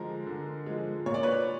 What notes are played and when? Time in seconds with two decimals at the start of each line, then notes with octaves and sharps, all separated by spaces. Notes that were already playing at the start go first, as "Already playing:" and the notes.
Already playing: D3 F3 G#3 A#4
0.27 D3
0.66 F3 G#3
1.06 A#2 C#5
1.14 D5
1.23 B4 C#5